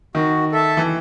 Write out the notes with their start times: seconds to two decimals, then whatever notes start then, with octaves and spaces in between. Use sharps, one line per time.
0.15 D#3 F#4
0.52 A4 E5 A5
0.77 E3